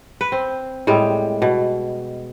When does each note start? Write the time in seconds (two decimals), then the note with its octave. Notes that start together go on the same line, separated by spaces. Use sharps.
0.21 B4
0.32 C4
0.87 A2 G3 G#3
1.42 B2